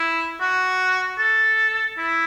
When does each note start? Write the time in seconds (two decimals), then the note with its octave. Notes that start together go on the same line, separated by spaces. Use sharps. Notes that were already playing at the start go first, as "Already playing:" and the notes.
Already playing: E4
0.40 F#4
1.18 A4
1.98 E4